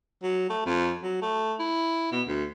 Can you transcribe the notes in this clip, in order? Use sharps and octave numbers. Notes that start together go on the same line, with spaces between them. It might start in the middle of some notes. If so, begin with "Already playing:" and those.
F#3
A3
F2
F#3
A3
E4
B2
D2